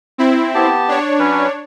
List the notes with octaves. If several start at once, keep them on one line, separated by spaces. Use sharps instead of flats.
C4 E4
B3 G4 A5
D4 C#5
F#3 C#4 B4